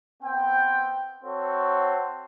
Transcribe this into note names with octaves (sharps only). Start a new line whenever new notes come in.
B3 C4 G5
C4 F#4 A4 C#5